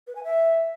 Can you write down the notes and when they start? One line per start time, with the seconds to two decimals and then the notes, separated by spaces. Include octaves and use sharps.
0.07 B4
0.16 G#5
0.24 E5